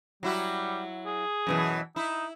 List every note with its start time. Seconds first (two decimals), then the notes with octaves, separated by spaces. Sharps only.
0.23 F#3 G3 E4 F#4
1.06 G#4
1.47 F#2 B2 E3
1.96 D#4 E4